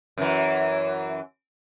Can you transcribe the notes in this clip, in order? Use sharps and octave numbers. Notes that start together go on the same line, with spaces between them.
F#2 E3